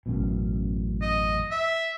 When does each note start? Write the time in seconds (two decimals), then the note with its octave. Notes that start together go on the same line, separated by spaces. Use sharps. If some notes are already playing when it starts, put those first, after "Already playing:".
0.06 A1 F#2 B2
1.02 D#5
1.51 E5